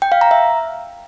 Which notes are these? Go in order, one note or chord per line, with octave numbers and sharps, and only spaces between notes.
G5
F5
A#5
E5